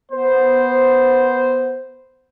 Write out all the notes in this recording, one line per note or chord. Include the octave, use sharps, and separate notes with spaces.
B3 C5